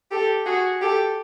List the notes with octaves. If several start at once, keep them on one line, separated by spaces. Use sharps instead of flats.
G4 A4
F#4 G#4
G4 A4